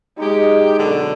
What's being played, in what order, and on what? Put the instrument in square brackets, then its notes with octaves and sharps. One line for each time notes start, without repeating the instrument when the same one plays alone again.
[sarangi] G#3 [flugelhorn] D#4 [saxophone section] G4
[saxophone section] F#2 B2 D3